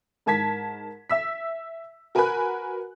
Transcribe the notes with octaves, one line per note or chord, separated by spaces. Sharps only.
G#2 A#4 A5 G#6 B6
E5 E6 B6
F#4 A#4 B4 G#5 B5 F#6